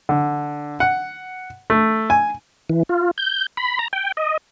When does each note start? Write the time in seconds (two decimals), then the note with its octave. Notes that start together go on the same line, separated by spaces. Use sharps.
0.09 D3
0.80 F#5
1.70 A3
2.10 G#5
2.70 E3
2.89 F4
3.18 G6
3.57 B5
3.79 A#5
3.93 G5
4.17 D#5